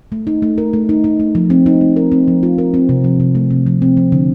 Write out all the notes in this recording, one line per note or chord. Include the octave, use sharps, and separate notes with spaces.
A3
D#4
A3
A#4
A3
D#4
D#4
A3
F3
C4
D#4
A3
A#4
C4
F3
F4
A#4
C4
C3
F3
C3
A3
C3
F3
C4
F3
D3